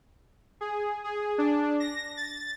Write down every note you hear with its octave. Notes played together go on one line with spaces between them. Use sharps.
G#4
G#4
D4
A#6
A6